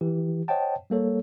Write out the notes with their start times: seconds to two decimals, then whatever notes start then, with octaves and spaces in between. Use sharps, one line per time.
0.01 E3 G4
0.48 C5 C#5 D#5 F#5 G5 A5
0.90 G3 A#3 A4 C#5